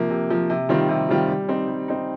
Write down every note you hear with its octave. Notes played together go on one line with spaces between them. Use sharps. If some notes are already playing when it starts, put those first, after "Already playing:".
Already playing: C3 F3 A#3
C3
F3 A#3
C3
D#3 G3 C4 F4
C3
D#3 G3 C4 F4
G3
C4 D#4
G3
C4 D#4